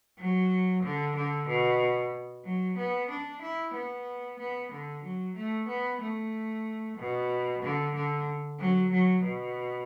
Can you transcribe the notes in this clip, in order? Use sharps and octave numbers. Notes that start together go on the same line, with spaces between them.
F#3
D3
D3
B2
F#3
B3
D4
E4
B3
B3
D3
F#3
A3
B3
A3
B2
D3
D3
F#3
F#3
B2